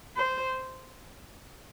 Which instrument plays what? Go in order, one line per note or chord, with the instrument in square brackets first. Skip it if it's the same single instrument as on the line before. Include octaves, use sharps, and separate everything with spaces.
[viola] C5